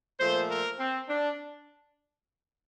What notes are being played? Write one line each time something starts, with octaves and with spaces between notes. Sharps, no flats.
A#2 F3 A3 C5
A#4
C4
D4